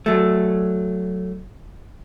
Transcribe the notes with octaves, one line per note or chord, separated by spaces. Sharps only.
F#3 A3